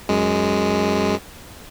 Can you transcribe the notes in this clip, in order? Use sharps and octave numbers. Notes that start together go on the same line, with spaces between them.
F#2 G#3